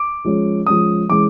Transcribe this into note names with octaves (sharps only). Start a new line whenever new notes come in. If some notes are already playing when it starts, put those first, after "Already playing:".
Already playing: D6
F3 G#3 C#4
F3 G#3 C#4 D#6
E3 G#3 C#4 D6